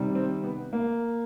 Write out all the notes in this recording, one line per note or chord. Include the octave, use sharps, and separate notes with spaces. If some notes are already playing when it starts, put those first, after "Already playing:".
Already playing: C3 D#3 G3
C4
B3
A#3